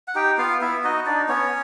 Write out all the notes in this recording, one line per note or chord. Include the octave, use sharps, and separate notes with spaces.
F#5
D#4 G4 G5
B3 F4 F5
B3 E4 E5
D#4 F#4 D#5
D4 D#4 D5
B3 C#4 C#5